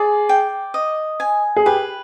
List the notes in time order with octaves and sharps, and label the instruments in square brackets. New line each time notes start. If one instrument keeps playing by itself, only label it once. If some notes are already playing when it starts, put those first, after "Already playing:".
Already playing: [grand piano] G#4 [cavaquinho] D5
[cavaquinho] G5
D#5
G#5
[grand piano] G#4
[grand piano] G4 [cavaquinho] B4